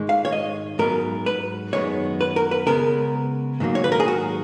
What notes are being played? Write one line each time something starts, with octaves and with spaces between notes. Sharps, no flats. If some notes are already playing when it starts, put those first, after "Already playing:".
Already playing: G#2 D#3 G#3
F5
C#5
D#5
G#2 F#3 B3 A#4
B4
F#2 D#3 G#3 B3 C#5
B4
A#4
B4
C#3 G#3 B3 A#4
G#2 D#3 F#3 A#3
C#5
B4
A#4
G#4
F#4